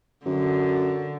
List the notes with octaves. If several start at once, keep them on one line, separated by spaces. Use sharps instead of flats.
F#2 D3